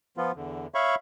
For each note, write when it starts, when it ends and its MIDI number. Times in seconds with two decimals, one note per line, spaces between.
0.17 0.32 53
0.17 0.32 59
0.17 0.32 65
0.36 0.67 40
0.36 0.67 50
0.74 0.95 73
0.74 0.95 76
0.74 0.95 77
0.74 0.95 83
0.74 0.95 85